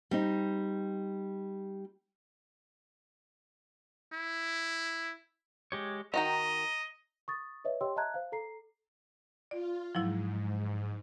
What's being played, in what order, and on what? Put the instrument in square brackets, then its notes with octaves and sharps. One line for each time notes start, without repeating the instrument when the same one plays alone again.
[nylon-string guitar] G3 C4 D#4
[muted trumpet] E4
[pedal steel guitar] G#3 G4 C#5
[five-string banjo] D#3 F#4 G5 [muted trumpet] D#5 [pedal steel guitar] A#5
[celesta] C#6 D#6 A6
B4 C#5 D#5 E5
G4 C#5 D#5 G5 C6 E6
D#5 E5 A5 A#5 F#6 G#6
C5 F5
A4 A#5 C7
[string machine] F4 [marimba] D5
[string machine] G#2 [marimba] F3 F#3 E4